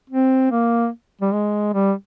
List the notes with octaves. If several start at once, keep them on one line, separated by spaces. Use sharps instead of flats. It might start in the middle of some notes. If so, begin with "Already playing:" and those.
C4
A#3
G3
G#3
G3